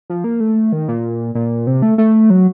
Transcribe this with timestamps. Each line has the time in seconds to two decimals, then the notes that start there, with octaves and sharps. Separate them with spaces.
0.10 F3
0.24 A#3
0.40 A3
0.72 D#3
0.88 A#2
1.35 A#2
1.67 C3
1.82 A3
1.98 A3
2.30 F#3